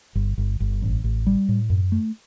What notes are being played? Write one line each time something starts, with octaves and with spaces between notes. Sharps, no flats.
G1
G1
G1
A1
A1
G3
A2
F#2
A3